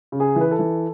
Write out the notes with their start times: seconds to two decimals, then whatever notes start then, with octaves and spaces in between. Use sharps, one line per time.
0.12 C#3
0.20 G#4
0.36 E3
0.41 B4
0.51 A4
0.59 E3